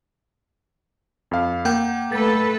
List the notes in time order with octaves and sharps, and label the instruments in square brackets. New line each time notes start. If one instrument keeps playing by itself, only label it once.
[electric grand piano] F2 F5
[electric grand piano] A#3 [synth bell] F#5 G5 G6
[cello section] A3 A4 B4 [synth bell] A6